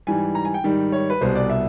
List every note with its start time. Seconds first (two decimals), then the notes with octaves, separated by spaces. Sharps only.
0.07 G#2 E3 G3 G#5
0.35 A#5
0.45 G#5
0.54 G5
0.64 G#2 D#3 G3
0.92 C#5
1.10 B4
1.21 C2 B2 G3 C5
1.35 D5
1.49 E5